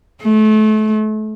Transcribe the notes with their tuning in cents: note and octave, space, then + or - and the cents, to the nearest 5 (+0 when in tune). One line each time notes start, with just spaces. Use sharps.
A3 -30